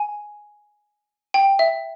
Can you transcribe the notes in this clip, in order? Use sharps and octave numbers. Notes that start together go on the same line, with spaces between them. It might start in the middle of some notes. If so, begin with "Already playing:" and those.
Already playing: G#5
G5
E5